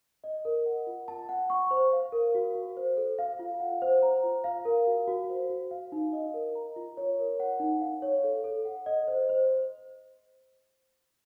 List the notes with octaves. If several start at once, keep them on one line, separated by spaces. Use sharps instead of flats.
D#5
A#4
F#5
F4
A5
F#5
C#6
C5
F5
A#4
F#4
F#4
C5
A4
F5
F4
F#5
C5
A#5
F4
F5
A#4
F#4
F#4
C5
F#4
F5
D#4
D#5
A#4
A#5
F4
C#5
A#4
F#5
D#4
F5
C#5
A4
A4
F#5
D#5
C5
C5